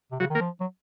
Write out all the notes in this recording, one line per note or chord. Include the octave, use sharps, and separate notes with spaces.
C3
C#3 F#3 F#4
D#3
A#3 A#4
F3
F#3